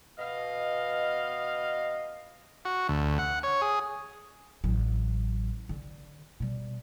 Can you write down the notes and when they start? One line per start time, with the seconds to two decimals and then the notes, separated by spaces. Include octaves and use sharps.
0.19 B2 D#5 F5
2.65 F#4
2.89 D2
3.19 F#5
3.43 C#5
3.61 G#4
4.64 A1 F#3
5.69 D3
6.40 B2 G3